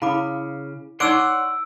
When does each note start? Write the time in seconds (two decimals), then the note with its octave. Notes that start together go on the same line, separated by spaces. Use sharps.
0.02 C#3 E4 F5 B5 D6
1.00 D#4 C#5 D5 F#5 C6 D6 E6 D7